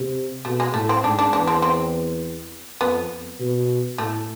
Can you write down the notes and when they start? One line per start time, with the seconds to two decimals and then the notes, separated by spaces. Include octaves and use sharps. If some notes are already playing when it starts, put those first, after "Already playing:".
Already playing: C3
0.45 B2 A3
0.60 G#3
0.74 A2 A3
0.89 C4
1.04 G#2 D4
1.19 D4
1.33 E2 D4
1.47 C4
1.62 C4
2.81 F2 B3
3.39 B2
3.98 A2 A3